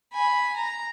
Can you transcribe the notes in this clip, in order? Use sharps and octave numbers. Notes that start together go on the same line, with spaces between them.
G#5 B5
A#5